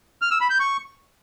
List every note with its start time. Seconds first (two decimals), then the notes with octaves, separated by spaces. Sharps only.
0.22 F6
0.31 E6
0.41 B5
0.50 G6
0.60 C#6